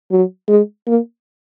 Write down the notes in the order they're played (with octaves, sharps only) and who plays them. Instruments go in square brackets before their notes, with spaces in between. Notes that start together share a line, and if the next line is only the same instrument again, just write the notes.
[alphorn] F#3
G#3
A#3